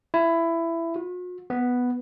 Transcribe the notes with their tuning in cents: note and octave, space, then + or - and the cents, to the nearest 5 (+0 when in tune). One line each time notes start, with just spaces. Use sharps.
E4 +15
F#4 -45
B3 +0